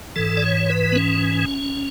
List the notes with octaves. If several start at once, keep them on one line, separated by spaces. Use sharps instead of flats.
G#2 E3 A4
D5
C#5
B4
B3
C#4